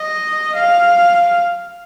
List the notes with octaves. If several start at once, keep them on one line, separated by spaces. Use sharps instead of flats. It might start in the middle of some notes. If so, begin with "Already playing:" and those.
Already playing: D#5
F5